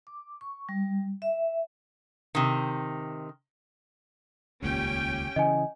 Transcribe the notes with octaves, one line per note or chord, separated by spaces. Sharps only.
D6
C#6
G3
E5
C3 D#3
D#1 C#2 A#2 C#4 G4 G5
C#3 E3 D#5 G#5